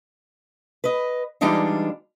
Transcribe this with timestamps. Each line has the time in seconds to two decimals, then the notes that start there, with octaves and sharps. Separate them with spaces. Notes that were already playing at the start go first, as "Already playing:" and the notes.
0.84 B4 D#5
1.41 E3 G3 G#3 D4 D#4 F4